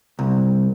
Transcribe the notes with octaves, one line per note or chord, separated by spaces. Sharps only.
C2